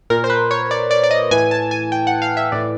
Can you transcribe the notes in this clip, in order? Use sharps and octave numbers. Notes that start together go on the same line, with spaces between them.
A#2 A#4
C5
B4
C#5
D5
D5
D5
D#5
A2 E3 G#5
A5
G#5
G5
F#5
F5
E5
A2 E3 D5